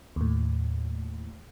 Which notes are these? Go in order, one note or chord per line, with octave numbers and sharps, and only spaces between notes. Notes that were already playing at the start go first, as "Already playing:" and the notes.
D#2 A2